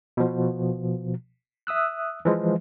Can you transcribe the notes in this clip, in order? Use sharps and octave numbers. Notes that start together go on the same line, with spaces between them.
B2 F3
E5 D#6 E6 F#6
E3 F3 G#3